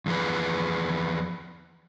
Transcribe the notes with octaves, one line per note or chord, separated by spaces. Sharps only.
E2 F3 G#4 B4